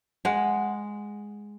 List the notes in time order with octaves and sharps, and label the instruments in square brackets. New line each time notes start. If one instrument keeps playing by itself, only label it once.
[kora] G#3 F#5